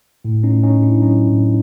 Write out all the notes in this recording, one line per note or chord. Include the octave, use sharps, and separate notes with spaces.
A2
C#4 D#4
A2
C#4 D#4
A2
D4 E4
F#3 C#4 D#4
A2